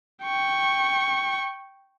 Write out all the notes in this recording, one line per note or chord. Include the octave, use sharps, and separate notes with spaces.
G5 C#6